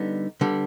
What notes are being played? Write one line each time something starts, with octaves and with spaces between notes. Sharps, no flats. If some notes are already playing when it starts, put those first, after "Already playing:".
Already playing: D3 G3 B3 D#4
D3 G3 B3